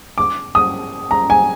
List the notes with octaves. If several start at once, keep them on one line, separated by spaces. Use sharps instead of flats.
D6
D#6
A#5
G#5